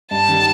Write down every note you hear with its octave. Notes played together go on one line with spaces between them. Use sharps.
G2 A5
D#3 G3